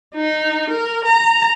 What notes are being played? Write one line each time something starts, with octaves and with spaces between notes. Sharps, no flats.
D#4
A#4
A#5